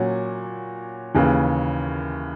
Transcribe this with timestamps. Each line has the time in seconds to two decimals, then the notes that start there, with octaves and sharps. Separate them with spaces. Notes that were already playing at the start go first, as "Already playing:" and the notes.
Already playing: A#2 F#3 C#4 F#4
1.14 D#2 C#3 E3